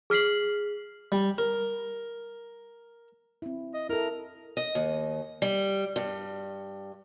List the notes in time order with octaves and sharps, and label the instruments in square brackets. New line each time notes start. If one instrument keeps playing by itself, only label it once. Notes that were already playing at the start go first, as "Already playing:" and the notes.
[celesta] G#4 F6 B6 C7 F#7
[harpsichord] G3
A#4
[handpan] C4 E4
[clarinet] D#5
[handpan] E4 A4 [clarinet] A#4
[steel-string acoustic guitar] D#5
D#2
G3
G2